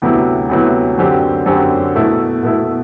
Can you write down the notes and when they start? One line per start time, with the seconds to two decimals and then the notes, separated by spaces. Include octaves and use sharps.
0.02 D2 C3 F#3 B3 E4
0.49 D2 C3 F#3 B3 E4
0.98 F#2 D3 F#3 C4 G4
1.46 F#2 D3 F#3 C4 G4
1.96 B2 A3 E4
2.43 B2 A3 E4